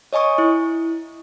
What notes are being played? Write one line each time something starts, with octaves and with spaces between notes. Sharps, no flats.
C#5 D#5 G#5 C#6 D#6
E4